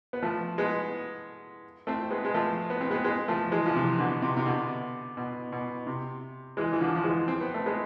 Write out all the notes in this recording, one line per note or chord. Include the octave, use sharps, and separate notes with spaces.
B3
F3 A3
G#3 B3
A3 C4
G#3 B3
G#3
F3 A3
B3
C4
G#3 B3
G#3 B3
F3 A3
E3 G#3
F3
C3 E3
B2 D3
C3
C3
B2 D3
B2
B2
C3
E3 G#3
E3
D3 F3
F3
E3 G#3
C4
B3
A3
G#3 B3